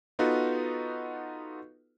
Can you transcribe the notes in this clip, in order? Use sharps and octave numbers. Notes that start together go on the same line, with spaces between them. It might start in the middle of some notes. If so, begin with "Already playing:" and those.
B3 D#4 F4 F#4 A4 B4